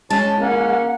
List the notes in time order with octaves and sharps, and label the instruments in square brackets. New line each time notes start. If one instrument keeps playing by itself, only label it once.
[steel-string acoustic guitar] G#3 [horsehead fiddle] C#4 [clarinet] A5
[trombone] A#3 [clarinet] C#4 [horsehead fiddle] F#5